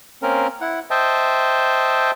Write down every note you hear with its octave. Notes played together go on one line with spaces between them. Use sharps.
A#3 C4 C#4 A#4
E4 F#5
C5 D#5 E5 G5 A5